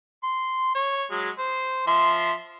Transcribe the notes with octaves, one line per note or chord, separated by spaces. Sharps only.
C6
C#5
F#3 G#3
C5
F3 E5 C6